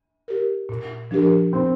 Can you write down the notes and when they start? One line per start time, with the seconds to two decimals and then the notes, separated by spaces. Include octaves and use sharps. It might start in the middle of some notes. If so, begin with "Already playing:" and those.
0.28 G4 A#4
0.69 A#2
1.11 F3 D4 G4 A#4
1.52 A#2 C4